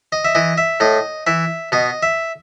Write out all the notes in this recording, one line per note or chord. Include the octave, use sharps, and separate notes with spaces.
D#5
E5
E3 D#5
E5
A2 D#5
E3 E5
B2 D#5
E5